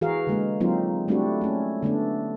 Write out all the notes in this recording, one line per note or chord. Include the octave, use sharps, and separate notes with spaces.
E3 F#4 G#4 A#4 F5
D3 G#3 A#3
F#3 A#3 C4 D#4 F4
G3 A3 C4 D4 E4 F#4
A3 C#4
D3 A3 B3 D4